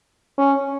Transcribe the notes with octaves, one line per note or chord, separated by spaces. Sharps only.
C#4